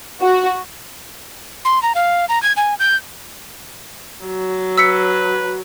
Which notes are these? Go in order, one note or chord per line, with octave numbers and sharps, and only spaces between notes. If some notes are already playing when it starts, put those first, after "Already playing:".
F#4
C6
A#5
F5
A#5
G#6
G#5
G6
F#3
B4 E6 B6 C#7